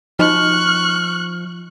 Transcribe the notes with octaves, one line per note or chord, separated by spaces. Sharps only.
F3 D#4 F#4 D#5 C#6 F6 F#6